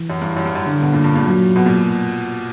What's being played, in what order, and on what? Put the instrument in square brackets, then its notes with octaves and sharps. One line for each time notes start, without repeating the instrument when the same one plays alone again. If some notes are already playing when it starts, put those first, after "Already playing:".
Already playing: [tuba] E3
[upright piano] F#2
G2
F#2
G2
F#2
[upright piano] G2 [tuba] D3
[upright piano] B2
A#2
G2
A#2
[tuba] F#3
[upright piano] B2
A#2